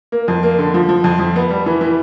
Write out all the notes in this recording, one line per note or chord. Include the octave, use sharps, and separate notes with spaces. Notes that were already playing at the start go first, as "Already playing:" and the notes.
A#3
F2
A#3
D3
F3
F3
F2
F2
B3
G3
E3
E3